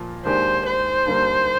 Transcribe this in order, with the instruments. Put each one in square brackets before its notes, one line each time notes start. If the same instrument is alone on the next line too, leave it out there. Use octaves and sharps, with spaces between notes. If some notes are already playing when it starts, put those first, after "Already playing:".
Already playing: [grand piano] A#2 F3 F4
[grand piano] D#2 D#3 G#3 D4 G4 [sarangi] C5
[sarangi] C5
[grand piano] D#2 D3 G3 A#3